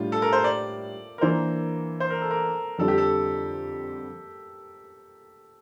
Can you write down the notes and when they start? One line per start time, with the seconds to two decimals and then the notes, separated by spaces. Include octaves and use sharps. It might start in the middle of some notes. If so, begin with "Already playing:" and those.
Already playing: A2 G3 D4 F4
0.12 A4
0.22 A#4
0.33 C5
0.44 D5
1.18 A#4
1.21 E3 A#3 D4 C5
2.00 C5
2.10 A#4
2.22 A4
2.31 A#4
2.78 F2 D3 G3 C4 A4
2.88 G4
2.98 A4